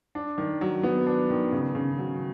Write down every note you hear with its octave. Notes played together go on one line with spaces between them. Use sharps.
D4
D#3
F#3
B3
D4
D#3
C#3
C#3
F#3